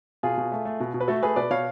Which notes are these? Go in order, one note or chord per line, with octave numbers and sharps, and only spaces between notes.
B2 F4 G#4
B2
A3
A3
B2
B2
B4
A3 F#4 A4
A3 G#4 B4
B2 B4 D5
B2 C#5 F5